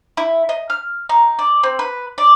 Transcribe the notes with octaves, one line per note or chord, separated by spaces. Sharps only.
E4
D#5
F6
D#4
D5
C4
B4
D5